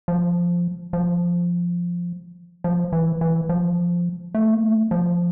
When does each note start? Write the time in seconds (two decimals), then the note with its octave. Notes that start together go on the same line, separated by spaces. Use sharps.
0.08 F3
0.93 F3
2.64 F3
2.92 E3
3.21 E3
3.49 F3
4.35 A3
4.54 A#3
4.63 A3
4.91 F3